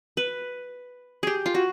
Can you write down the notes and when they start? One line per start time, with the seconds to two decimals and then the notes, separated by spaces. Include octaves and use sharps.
0.17 B4
1.23 G4 G#4
1.46 F4
1.54 F#4